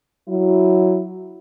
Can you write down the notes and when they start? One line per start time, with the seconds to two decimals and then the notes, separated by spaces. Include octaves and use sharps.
0.29 F#3 E4